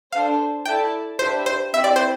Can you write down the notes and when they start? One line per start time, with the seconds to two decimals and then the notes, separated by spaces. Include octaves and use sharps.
0.12 D4 A4 C5 F5
0.65 E4 A4 D5 G5 A5
1.19 D4 G4 B4 C5 E5
1.46 C5
1.73 C4 E4 G4 E5
1.84 D5
1.96 C5